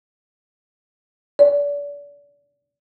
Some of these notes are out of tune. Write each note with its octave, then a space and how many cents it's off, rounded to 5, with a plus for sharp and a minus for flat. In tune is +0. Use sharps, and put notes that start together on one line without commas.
D5 -35